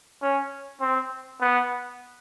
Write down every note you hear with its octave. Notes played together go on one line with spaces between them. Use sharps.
C#4
C4
B3